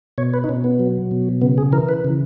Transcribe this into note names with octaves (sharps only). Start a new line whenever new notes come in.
B2 C#5
B4
D#4
B2 C#4
B3
F#3
B2
C#3 B3
G#4
E3 A#4
B4
C#3